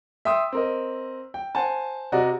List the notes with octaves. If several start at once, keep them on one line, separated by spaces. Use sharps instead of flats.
E5 G5 C6 D#6 E6
C4 A#4 D#5
G5
C5 F#5 G#5 A5
C3 F#4 D5 D#5 A#5